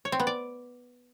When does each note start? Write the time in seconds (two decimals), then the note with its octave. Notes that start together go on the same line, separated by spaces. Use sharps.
0.05 C#5
0.12 C4
0.20 B3
0.27 D5